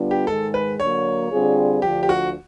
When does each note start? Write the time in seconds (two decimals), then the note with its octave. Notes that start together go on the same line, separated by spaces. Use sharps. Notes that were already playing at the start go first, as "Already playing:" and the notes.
Already playing: D3 G3 B3 D4 F4
0.11 G4
0.27 G#2 D#3 G#3 A4
0.54 B4
0.79 D3 F#3 A#3 C#5
1.31 D3 G3 C4 F4 G#4
1.82 D2 D3 F3 G4
2.03 G4
2.09 F#4